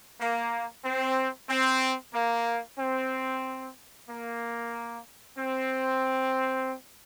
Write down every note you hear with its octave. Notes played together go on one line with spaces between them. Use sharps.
A#3
C4
C4
A#3
C4
A#3
C4